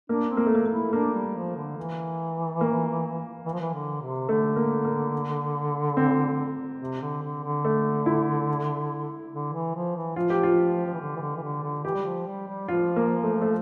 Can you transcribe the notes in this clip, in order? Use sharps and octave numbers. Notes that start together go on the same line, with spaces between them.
A#3 D4
C4
A#3
A3
A#3
A#3
E4
A#3 D4
G3
F3
D3
E3
A#3
E3
F3
E3
D3
C3
D3 A3
A#3
A#3
C4
C3
D3
D3
D3
A3
E4
D3
E3
F3
E3
F3 F4
G4
F4
F3
E3
D3
E3
D3
E3
D3
D3
E3 G4
G3
F3
G3
G3
F3 F4
A#3
A3
A3